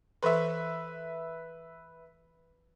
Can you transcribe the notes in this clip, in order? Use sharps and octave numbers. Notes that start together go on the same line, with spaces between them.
E3 A4 B4 E5 C6